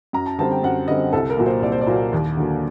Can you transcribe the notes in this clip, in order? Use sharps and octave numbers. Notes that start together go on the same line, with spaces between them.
F#2 A#5
A5
D3 G3 C4 A5
G5
F#2 F#5
D3 G3 C4 D#5
C2 A4
A#4
A#2 F#3 A#3
C5
C2 D5
C5
D5
A#2 F#3 A#3
D#2
D3 F#3 A#3